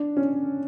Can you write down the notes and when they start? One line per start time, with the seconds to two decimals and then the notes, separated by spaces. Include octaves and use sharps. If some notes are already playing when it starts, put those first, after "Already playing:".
Already playing: D4
0.17 C#4